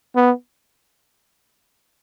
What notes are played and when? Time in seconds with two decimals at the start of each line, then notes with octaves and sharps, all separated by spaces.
0.16 B3